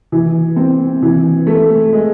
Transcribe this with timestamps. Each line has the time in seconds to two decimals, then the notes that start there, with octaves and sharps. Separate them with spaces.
0.12 E3
0.56 C4
1.02 E3
1.47 A3
1.93 G#3